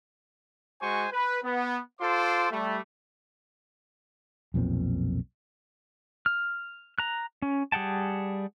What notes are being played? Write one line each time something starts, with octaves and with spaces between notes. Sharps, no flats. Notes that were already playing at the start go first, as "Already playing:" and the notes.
G#3 F#4 C5 G#5 C#6
B4
B3
F4 A4 C5 C6 D6
G3 A3
B1 F2 A#2 C4
F6
A#5 F#6
C#4
G3 G#4 F#5 G5 A5